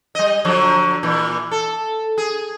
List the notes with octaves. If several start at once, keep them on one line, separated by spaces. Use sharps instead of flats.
G3 D#5
D3 F3 F#3
A#2 E3
A4
G#4